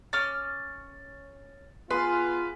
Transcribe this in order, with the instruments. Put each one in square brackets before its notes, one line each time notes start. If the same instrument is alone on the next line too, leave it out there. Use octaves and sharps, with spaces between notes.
[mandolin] C#4 D6 F6 [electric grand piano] A6
[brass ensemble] B3 F4 [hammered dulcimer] G#4 [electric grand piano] B4 [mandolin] C6